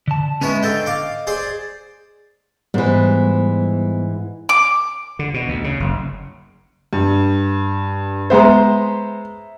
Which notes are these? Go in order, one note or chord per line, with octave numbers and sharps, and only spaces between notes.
D3 A5
G#3 B3 C#4 E4 C#5
D3 A4 D#5 G5
F5 D6
G#4 C5 D5
G#2 E3 G3 B3 C5
D6
D3
B2
D2
C#3
F#1
G2
G#3 B3 C5 E5 A#5